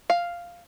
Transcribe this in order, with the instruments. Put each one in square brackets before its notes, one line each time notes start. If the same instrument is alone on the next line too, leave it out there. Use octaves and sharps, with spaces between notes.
[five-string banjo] F5